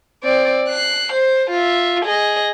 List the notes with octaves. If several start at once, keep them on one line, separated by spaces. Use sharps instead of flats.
C4 D5
F#6 C7
C5
F4 E5
G#4 D#5